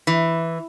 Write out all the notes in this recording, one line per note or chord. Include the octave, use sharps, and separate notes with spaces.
E3